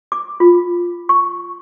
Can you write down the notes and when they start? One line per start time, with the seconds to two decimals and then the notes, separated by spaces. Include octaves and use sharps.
0.12 D6
0.40 F4
1.09 C#6